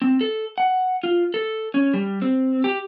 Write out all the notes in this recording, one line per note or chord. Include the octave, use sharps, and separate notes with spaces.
C4
A4
F#5
F4
A4
C#4
G3
C4
G4